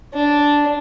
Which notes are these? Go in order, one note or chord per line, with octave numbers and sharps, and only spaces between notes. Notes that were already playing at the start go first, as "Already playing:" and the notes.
D4